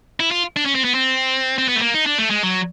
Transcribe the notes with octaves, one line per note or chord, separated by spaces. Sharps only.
E4
F4
D4
C#4
C4
B3
C4
C4
B3
A3
A#3
D#4
D4
A3
G#3
F#3